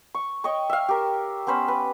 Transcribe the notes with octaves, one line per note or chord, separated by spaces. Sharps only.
C#6
C#5 D#5 G5 C#6
E5 F5
G4 A#4
B3 C#4 C5 B5
B4